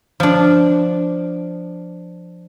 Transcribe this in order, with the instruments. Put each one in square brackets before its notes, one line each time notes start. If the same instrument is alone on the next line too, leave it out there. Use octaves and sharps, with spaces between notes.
[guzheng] F3 D4